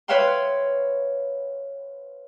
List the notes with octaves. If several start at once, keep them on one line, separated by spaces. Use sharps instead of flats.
B4 C#5 E5 F5 G5 C6